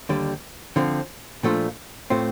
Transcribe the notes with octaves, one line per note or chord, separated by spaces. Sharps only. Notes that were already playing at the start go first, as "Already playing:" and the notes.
D#2 D3 G3
D3 F3 C4
A#2 F3 A3 D4 F4
A2 A3 C4 F4